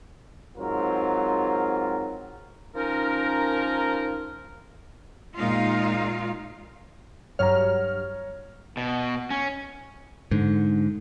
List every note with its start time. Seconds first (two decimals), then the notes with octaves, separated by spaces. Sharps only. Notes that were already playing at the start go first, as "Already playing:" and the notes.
0.57 G#2 F#3 C4 F4 A#4
2.74 F3 C#4 D#4 A#4
5.36 A#2 G#3 D#4 F4 F5
7.39 G2 F#3 C#5 A#5 F6
8.77 B2
9.30 C#4
10.31 G#2 D3